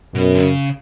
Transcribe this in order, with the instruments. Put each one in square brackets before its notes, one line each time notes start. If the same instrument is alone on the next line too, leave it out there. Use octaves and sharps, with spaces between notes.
[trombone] F#2 [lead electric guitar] B2
[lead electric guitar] D3
C#3